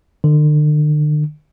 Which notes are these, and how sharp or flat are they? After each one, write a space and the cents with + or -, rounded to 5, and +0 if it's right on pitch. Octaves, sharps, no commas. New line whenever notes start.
D3 +40